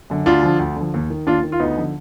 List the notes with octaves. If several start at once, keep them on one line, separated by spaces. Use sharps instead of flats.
F#2 D3
D2 D4 F4
D3 F3
D2
D3 F3
D#2
D#3
D#2 D4 F4
D#3
F4
D2 B3 D#4
D3 F3